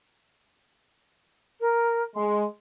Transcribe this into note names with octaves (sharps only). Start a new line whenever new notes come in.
A#4
G#3 C6